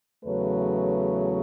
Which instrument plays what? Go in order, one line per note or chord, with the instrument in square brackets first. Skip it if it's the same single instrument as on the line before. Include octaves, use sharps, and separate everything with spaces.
[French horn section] E2 C#3 F#3 A3 B4 C#5